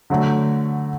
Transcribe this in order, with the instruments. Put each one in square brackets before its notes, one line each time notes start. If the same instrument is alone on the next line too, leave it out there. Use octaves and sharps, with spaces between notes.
[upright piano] D3 F#3 A3